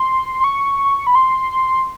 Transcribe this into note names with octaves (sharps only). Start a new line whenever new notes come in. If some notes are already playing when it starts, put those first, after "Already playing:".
Already playing: C6
C6
C#6
B5
C6